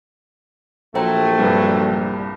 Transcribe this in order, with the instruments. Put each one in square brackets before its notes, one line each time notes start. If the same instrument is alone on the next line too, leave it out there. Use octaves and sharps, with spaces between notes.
[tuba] A#1 [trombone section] F#3 A3 [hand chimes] C5 G5 A#5
[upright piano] C2 G2